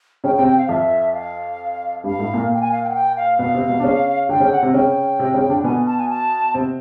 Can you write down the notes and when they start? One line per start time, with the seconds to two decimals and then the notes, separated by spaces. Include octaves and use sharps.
0.24 C#3 C#4 G5
0.35 G5
0.39 C3 C4
0.47 G5
0.58 F5
0.69 F2 F3 E5
1.14 F5
2.04 G2 G3 F5
2.19 A2 A3
2.34 A#2 A#3
2.55 G5
2.61 G#5
2.72 F5
2.84 G5
2.90 F#5
2.94 G5
3.16 F5
3.39 B2 B3 F5
3.55 C3 C4
3.69 B2 B3
3.80 D4
3.84 C#3 C#4
4.29 D3 D4 G5
4.40 C#3 C#4
4.52 F#5
4.63 C3 C4
4.74 C#3 C#4 G5
5.19 C3 C4
5.34 C#3 C#4
5.49 D3 D4
5.64 B2 B3 G#5
5.87 A5
5.98 G#5
6.10 A5
6.54 C3 C4